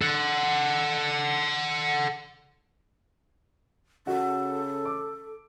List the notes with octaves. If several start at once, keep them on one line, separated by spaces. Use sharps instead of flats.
A4 F#5
C#3 F#4 A4
D6